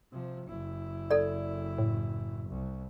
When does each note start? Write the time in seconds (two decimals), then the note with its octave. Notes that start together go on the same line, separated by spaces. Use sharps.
0.12 C3 F3
0.47 F#1 E4
1.11 A4 D5
1.78 A2
2.49 C2